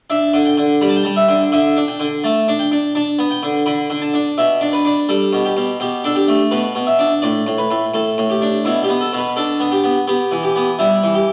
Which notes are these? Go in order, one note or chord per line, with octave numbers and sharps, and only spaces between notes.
D4 E5
D3
G5
D3
G3 B5
A5
G5
G3 A5
E5
D3
D3 E5
D4
G5
D3
A3 A5
D4
G5
D4
D4 A5
B3
G5
D3
D3 B5
D3
A5
D4
B2 E5
D4
B4
D4
G3 A4
B2
G4
B2
B2 G4
D4 A4
G4
A3
B2 B4
B2
E5
D4
A2 D5
A2
B4
A2
A2 A4
A2
G4
D4
B2 E4
G4
B3
A4
B2
B4
D4 A4
B3
G4
B3
B3 G4
E3
G4
B3
G3 E4
E3
G4